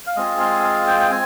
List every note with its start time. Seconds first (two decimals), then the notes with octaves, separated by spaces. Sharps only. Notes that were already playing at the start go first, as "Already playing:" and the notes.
0.07 F5
0.16 G#3 C4 F4 G#4 D#5
0.40 F5
0.63 F5
0.87 G5
1.00 G5
1.11 C4 G#5